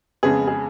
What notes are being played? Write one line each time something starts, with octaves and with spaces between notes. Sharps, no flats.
F2 C#3 G#3 B3 G#4
G#4